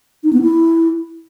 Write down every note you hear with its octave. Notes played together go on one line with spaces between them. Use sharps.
D#4
B3
E4